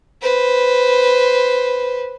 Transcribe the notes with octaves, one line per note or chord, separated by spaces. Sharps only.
B4 C5